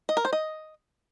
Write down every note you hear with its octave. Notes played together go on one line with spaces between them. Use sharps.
D#5
A#4
C5
D#5